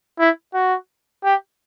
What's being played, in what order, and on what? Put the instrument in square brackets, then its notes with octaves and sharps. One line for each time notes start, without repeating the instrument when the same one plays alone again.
[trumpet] E4
F#4
G4